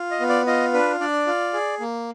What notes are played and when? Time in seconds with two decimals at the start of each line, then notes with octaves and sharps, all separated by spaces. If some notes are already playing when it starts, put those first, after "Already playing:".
Already playing: F4
0.11 D#5
0.20 B3
0.29 D5
0.47 F4 D#5
0.73 D4 B4
1.00 D4 D5
1.27 F4
1.53 G#4
1.80 A#3